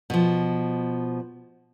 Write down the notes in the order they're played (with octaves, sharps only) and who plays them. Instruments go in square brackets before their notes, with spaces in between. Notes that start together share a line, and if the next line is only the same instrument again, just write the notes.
[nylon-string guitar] B2 F3